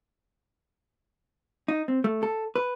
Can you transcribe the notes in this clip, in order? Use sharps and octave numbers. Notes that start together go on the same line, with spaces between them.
D#4
C4
A3
A4
B4